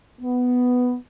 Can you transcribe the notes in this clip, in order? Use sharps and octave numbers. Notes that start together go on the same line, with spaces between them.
B3